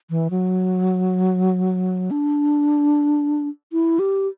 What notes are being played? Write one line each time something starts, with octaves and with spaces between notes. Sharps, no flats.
E3
F#3
D4
E4
G4